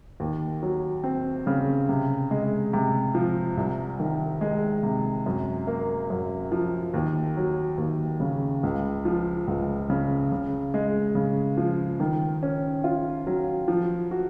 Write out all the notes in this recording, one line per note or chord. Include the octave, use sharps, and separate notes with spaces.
D#2
F#3
C4
C#3
C3
G#3
C3
F3
C2
D#3
G#3
C3
F#2
A#3
F#2
F3
D#2
F#3
D#2
C#3
C#2
F3
C#2
C#3
C#3
G#3
C#3
F3
D#3
C#4
F4
F#3
F3
F#4